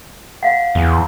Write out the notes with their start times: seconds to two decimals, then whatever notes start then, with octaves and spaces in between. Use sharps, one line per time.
0.43 F5 F#5
0.75 E2